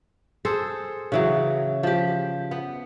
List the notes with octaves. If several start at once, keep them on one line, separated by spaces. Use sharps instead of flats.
G#4 A4 C5
C#3 E3 F#3
F3 G4
B3